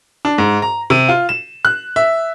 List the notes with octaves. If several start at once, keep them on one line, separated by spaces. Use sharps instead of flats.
D4
G#2
A#5
C3
F4
E7
F#6
E5